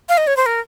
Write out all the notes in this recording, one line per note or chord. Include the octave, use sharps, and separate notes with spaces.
F5
D#5
C#5
C5
A#4